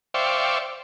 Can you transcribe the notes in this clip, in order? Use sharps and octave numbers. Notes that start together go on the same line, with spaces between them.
C5 D5 E5 F5 G5 C#6